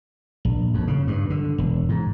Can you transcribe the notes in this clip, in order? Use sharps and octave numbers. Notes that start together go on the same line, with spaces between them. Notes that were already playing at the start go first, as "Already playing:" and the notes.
A#1
F2
C#3
G2
D3
E1
G#2